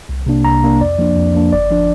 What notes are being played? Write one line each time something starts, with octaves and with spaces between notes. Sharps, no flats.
C2
C3 A#3 D4
C2 A#5
C3 A#3 D4
F2 D5
F3 A#3 D4
F2
F3 A#3 D4
G1 D5
F3 D4